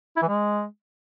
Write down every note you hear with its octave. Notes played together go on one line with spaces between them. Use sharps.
E4
E3
G#3